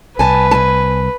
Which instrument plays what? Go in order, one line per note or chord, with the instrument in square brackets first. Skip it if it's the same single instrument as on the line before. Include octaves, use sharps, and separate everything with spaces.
[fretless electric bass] C2 [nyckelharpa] B4 [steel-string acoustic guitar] G#5 A5
[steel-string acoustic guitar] G#5 A5